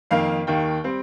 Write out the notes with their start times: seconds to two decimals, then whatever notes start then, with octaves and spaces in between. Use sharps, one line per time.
0.11 F2 D#3 A#3 F5
0.47 D#2 D#3 A#3 G5
0.84 G3 C4